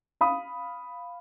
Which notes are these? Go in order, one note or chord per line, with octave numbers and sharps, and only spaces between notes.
F5 B5 D#6